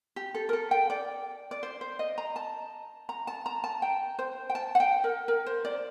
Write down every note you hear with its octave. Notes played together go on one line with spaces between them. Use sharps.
G4
A4
A#4
A4
G5
D5
D5
C5
C5
D#5
A#5
A5
A#5
A5
A#5
A5
G5
C5
G5
A5
F#5
G5
A#4
A#4
C5
D5